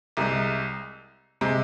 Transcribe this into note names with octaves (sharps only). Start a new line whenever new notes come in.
C2 C3 G#3
C3 G#3